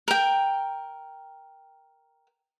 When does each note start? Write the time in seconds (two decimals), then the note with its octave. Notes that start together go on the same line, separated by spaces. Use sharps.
0.08 A#4 G5